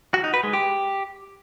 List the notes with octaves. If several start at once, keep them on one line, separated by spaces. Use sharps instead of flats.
F#4
D#4
B4
G#3
G4